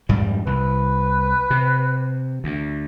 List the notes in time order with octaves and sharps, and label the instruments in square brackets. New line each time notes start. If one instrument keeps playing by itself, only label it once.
[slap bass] F2 G#2 G3
[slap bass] C2 [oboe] B4
[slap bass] C3
D2